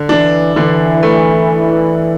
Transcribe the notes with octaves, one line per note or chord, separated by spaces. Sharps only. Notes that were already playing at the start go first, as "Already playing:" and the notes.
Already playing: D3
E3 D4
D3 E3
A3